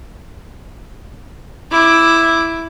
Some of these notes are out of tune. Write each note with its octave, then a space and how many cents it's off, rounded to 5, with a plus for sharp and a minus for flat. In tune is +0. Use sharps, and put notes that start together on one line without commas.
E4 +0 D6 +0